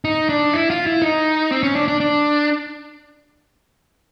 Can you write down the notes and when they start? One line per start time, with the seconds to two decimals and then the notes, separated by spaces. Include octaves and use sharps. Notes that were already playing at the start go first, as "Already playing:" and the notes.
0.05 D#4
0.29 D4
0.53 E4
0.70 F4
0.86 E4
1.02 D#4
1.52 C4
1.63 C#4
1.76 D4
1.88 D4
2.00 D4